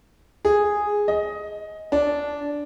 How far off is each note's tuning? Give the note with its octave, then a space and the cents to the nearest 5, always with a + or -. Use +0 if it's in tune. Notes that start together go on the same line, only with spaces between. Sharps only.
G#4 -5
D#5 +15
D4 -10